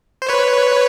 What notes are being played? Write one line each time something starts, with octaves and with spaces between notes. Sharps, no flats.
C5
B4 C#5